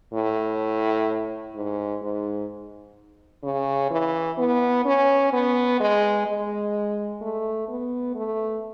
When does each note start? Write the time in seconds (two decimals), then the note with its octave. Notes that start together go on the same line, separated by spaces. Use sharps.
0.13 A2
1.55 G#2
2.02 G#2
3.43 C#3
3.90 E3
4.38 B3
4.85 C#4
5.33 B3
5.80 G#3
6.26 G#3
7.21 A3
7.68 B3
8.15 A3